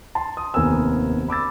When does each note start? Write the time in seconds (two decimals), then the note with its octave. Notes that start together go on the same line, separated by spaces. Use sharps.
0.15 A5 C6
0.37 D#6
0.54 F1 D#2 B3 A#4 G#5 E6
1.28 B5 D6 E6 A6